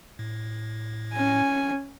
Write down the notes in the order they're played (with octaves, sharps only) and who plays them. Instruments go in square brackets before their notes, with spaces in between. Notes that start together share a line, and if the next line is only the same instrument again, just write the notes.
[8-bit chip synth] A2
[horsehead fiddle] C#4 G#5